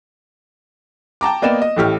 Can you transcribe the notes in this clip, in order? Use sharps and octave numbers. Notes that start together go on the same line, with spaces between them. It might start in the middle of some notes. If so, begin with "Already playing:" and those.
G5 A5 A#5 D6
A#3 B3 D5 D#5 G5 E7
D#5
A1 A2 G4 F6